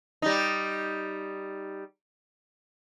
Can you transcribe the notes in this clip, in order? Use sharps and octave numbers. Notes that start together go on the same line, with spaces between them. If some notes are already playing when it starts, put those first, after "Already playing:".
G3 D#4